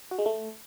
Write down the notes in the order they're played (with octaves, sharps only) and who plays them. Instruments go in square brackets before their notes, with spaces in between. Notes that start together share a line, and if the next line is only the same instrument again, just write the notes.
[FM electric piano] F#4
G#3
A3